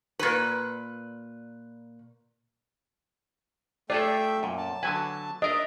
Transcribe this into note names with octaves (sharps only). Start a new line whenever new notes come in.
A#2 B4
A3 F4 G#4 A4 D5 E5 G5
F#2 A#2
A5
D3 F#3 B4 G#5
D4 A#4 D#5 E5